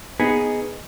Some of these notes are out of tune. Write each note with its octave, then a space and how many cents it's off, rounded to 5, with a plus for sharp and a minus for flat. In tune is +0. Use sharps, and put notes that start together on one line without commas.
B3 +0 D#4 +0 G#4 +0